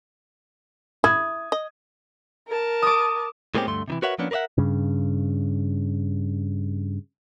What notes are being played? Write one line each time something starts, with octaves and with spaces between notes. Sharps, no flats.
E4 D#6 G#6
D#5
A#4 A5
D6 D#6
A2 G#3 A#3 C4 C#4 G4
D2 G2 A3 C6
C3 D#3 E3
F#4 A#4 B4 C#5 E5 F#5
F3 A#3 B3 C#4 D4
A#4 B4 D5 E5 F#5
G2 C#3